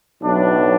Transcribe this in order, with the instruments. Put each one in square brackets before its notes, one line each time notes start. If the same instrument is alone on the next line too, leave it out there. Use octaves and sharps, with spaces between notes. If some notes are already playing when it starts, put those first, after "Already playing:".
[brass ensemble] B1 A2 F#3 B3 D4